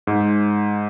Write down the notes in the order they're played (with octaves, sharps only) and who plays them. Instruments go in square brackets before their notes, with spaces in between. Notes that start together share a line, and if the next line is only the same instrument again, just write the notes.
[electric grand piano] G#2